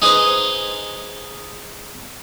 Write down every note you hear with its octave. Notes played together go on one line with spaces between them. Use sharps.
D#4 G#4 B4 C5 D#5